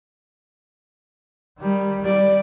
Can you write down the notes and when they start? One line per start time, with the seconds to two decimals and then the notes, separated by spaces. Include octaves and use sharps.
1.59 D#3 G3
2.05 G3 D5